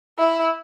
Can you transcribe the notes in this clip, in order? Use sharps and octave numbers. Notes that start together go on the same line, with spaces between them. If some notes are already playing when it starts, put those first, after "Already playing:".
E4